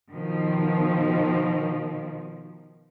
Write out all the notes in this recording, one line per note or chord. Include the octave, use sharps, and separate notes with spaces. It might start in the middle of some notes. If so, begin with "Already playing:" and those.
B2 D#3 F3